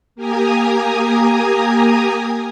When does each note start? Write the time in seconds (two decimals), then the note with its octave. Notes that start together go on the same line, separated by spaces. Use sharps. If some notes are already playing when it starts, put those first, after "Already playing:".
0.16 A#3 G4 G#5 A#5 D#6